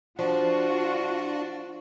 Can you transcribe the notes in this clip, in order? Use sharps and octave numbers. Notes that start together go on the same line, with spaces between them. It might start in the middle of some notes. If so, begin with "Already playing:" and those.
F3 D4 F4 F#4